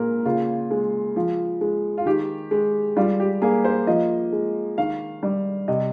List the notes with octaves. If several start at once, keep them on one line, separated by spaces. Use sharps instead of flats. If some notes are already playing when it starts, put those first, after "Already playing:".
Already playing: A#2 G#3 A#4
C#3 F4
G#3
F3
G#3
F4
D#3 G4
G#3
G3 F4
G4
A#3 G#4
C5
F3 D#5
G#3
D#3 F5
G3
C3 D#5